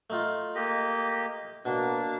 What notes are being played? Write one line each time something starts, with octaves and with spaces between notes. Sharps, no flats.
A3 D#4 F4
A#3 G4 D#5
B2 A#3 D4